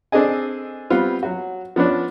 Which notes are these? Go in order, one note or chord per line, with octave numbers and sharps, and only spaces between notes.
C4 D4 G#4 A4 D#5 G#5
G3 B3 C4 F4
F#3 F#4
F3 B3 C#4 D4